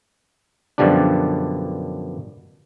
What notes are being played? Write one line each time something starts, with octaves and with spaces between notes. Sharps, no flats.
F#2 B2 D3 F3 G3 D4